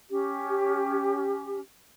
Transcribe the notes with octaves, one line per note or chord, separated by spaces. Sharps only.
C#4 G4